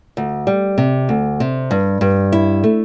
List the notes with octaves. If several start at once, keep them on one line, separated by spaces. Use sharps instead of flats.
D2
G3
C3
D2
C3
G2
G2
E4
A3